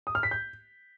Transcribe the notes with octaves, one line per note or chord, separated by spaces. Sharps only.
D#6
F6
B6
G6